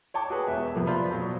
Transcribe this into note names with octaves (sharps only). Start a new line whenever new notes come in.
C#5 G5 A5 D6
F#4 G#4 B4 C#5
E1 E5
F2 C3 F3 A#3 B3
F4 C5 D5 B5 C6
B2 F#3